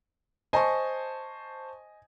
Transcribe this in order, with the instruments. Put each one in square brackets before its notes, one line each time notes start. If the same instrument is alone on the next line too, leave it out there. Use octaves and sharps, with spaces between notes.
[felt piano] C5 A5 C#6 [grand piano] D#5 G#5